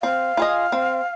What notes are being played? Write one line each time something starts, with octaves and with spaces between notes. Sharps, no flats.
C4 F5
F4 G#4 D#5
C4